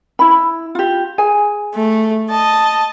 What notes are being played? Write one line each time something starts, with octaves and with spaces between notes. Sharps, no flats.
E4 B5
F4 G4
G#4 G#5
A3
D#5 A5